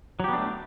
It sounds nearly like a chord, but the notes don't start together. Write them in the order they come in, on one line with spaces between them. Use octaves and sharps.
F#3 G4 B3 D4 A3